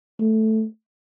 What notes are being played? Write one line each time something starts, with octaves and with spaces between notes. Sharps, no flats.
A3